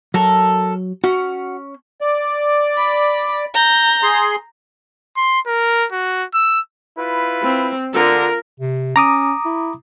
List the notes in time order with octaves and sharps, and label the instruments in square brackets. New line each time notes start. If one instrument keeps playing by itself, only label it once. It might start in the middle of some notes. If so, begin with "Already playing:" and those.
[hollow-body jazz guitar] F#3 [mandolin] A4 A#4
[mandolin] C#4 [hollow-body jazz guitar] F#4
[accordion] D5
[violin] B5
A#5 G6
[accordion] G#4 C6
[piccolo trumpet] C6
A#4
F#4
E6
[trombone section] E4 F4 B4
[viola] C4
[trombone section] D3 [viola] F4 A#4
[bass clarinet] C3
[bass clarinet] C#4 [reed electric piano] A#5 D6 D#6
[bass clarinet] E4